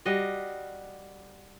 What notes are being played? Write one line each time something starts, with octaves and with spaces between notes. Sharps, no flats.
G3 F#4 D#5 F5